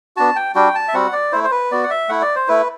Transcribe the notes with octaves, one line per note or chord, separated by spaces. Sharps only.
B3 D4 F#4 A5
G5
G3 D4 F#4 G5
A5
E5
G3 C4 F#4 F#5
D5
A3 E4 C5
C5
B4
B3 F#4 D5
F#5
E5
A3 E4 F#5
D5
C5
A3 E4 B4